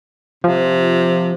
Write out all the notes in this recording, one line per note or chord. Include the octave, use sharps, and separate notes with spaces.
C3 F3